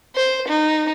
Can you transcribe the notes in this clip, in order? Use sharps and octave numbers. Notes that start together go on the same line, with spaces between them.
C5
D#4